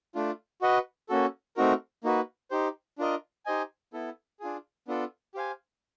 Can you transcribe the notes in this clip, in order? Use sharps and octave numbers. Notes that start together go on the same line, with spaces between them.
A3 D4 F4
F#4 B4 D#5 F#5
A#3 C#4 F#4 A4
A3 C4 D#4 F#4 A#4
A#3 D#4 F#4 B4
D#4 G4 C5
D4 F4 A#4 D#5
D#4 G4 C5 D#5 G#5
B3 E4 A4
D4 F4 G#4
B3 D4 F4 A4
G4 C5 F5 G#5